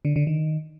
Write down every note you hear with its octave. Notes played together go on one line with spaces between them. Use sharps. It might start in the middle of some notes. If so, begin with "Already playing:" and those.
D3
D3
D#3